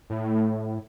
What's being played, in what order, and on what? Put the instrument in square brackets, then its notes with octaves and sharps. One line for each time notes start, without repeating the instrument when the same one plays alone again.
[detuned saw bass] A2